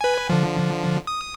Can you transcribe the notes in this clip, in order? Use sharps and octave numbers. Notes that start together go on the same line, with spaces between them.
B4 G#5
D3 F3
D#6